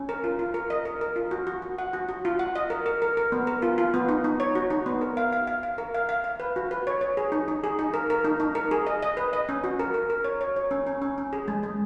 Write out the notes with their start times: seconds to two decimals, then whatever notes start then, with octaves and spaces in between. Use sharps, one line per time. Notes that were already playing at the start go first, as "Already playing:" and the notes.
Already playing: C#4
0.09 A#4
0.24 F4
0.39 F4
0.54 A#4
0.70 D#5
0.85 A#4
1.01 A#4
1.16 F4
1.31 F#4
1.47 F#4
1.62 F#4
1.78 F#5
1.93 F#4
2.09 F#4
2.25 F4
2.39 F#5
2.56 D#5
2.70 A#4
2.86 A#4
3.02 A#4
3.17 A#4
3.32 B3
3.47 A#4
3.62 F4
3.78 F4
3.94 B3
4.09 D#4
4.24 D#4
4.40 C#5
4.55 F#4
4.70 D#4
4.86 B3
5.01 A#4
5.17 F5
5.32 F5
5.47 F5
5.63 F5
5.78 A#4
5.94 F5
6.09 F5
6.24 F5
6.40 B4
6.56 F#4
6.71 B4
6.87 C#5
7.01 C#5
7.17 G#4
7.32 D#4
7.48 D#4
7.64 G#4
7.79 D#4
7.94 A#4
8.10 A#4
8.25 D#4
8.40 D#4
8.55 A#4
8.71 G#4
8.87 D#5
9.03 D#5
9.17 B4
9.33 D#5
9.49 C#4
9.64 F#4
9.80 A#4
9.94 A#4
10.10 A#4
10.25 C#5
10.41 C#5
10.56 C#5
10.71 C#4
10.87 C#4
11.02 C#4
11.18 C#4
11.33 G#4
11.48 G#3
11.63 G#3